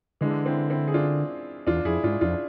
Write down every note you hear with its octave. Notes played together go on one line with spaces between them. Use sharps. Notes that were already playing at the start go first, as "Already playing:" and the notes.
D3 E3 G#3
C4 E4
C4 E4
G#4
D4 F4
E2 D4 F4
F2 E4 G#4
G#2 D4 F4
F2 D4 F4